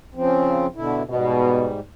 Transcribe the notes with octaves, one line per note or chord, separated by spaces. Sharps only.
C#3 F3 C4
B2 D3 E4
G#2 B2 G3